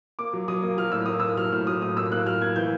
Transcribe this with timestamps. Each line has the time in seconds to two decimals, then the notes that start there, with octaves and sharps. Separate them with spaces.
0.19 A#3 D6
0.33 F#3
0.48 F#3 D#6
0.63 A#3
0.78 F#3 F6
0.92 A2 E6
1.06 A#3 D#6
1.20 A#3 E6
1.37 F#3 F6
1.52 A2 F6
1.67 F#3 D#6
1.82 A2 D#6
1.97 A#3 E6
2.12 A#3 F#6
2.26 F#3 F6
2.42 A#3 G#6
2.56 E3 G6